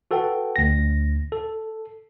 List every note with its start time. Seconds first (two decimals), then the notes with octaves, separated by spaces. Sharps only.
0.11 F#4 A4 B4 F#5 G5
0.56 D2 A#6
1.32 A4